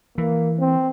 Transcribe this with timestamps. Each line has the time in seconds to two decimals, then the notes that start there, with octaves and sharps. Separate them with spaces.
0.18 E3 A#3
0.59 C4